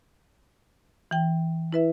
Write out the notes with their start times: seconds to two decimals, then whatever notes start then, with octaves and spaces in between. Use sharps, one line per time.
1.11 E3 G5
1.73 E4 B4 E5